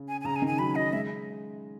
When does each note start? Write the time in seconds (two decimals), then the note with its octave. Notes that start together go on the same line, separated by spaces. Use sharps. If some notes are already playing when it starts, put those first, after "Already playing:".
Already playing: C#3
0.08 G#5
0.21 G#5
0.25 C#3 A#5
0.36 G#5
0.42 D#3
0.47 G#5
0.59 F#3 B5
0.75 F#3 D#5
0.93 G#3 E5